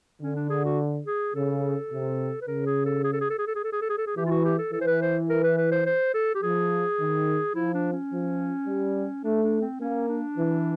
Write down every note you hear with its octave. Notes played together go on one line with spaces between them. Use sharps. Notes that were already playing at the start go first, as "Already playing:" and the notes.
D3 C#4
D4
G#4
F#4
G#4
C#3 A4
C3
B4
C#3 A#4
G#4
A4
G#4
A4
G#4
A4
G#4
A4
G#4
A4
G#4
A4
G#4
A4
G#4
E3 G4
F4
F#4
G4
A4
E3 A4
C5
B4
C5
A#4
B4
B4
C5
C5
A4
G4
F3 G#4
D#3
F3 E4
D4
C#4
F3
G3
A3 D4
D4
C4
A#3 C#4
D4
E3